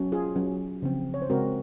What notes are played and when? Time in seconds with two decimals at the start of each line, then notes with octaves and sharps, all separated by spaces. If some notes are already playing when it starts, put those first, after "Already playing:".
Already playing: F#3 C#4
0.12 F4 G#4
0.36 F#3 C#4
0.82 C#3 F3 C4
1.14 C#5
1.22 C5
1.30 C#3 G#3 C4 F#4 A#4